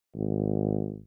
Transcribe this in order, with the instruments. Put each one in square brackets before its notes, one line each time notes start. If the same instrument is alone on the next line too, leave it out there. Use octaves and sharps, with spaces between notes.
[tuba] G#1